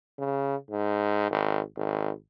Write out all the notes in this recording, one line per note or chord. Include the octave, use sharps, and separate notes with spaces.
C#3
G#2
G#1
G#1